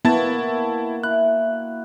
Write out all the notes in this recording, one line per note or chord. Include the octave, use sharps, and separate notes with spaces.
A#3 B3 E4 F#4 A5 A6
E4 F#6